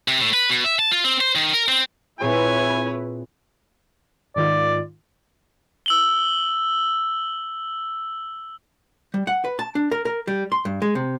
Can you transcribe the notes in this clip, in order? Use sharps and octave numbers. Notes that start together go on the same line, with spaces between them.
C3
A2
B4
B2
E5
A5
F4
C4
C5
D#3
A#4
C4
A#2 C4 E4 G#4 B4 C#5 G#5
G#2 D#3 F4 D5
E6 F#7 G7
G3
F#5
B4
A5
D4
A#4
A#4
G3
C6
G2
G#3
C3